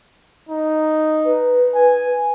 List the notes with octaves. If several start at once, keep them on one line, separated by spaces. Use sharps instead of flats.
D#4
B4
G#5